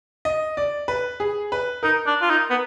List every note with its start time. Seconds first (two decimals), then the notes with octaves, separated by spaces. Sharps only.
0.25 D#5
0.57 D5
0.88 B4
1.20 G#4
1.52 B4
1.83 D#4 A#4
2.06 D4
2.22 F4
2.30 D#4
2.50 B3